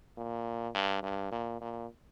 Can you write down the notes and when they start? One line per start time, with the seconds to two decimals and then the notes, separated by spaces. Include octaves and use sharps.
0.17 A#2
0.74 G2
1.03 G2
1.32 A#2
1.61 A#2